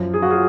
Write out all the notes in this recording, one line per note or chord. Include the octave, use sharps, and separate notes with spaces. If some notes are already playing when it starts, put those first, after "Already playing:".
Already playing: F#2 F3
G#4
F#4
F4 G#4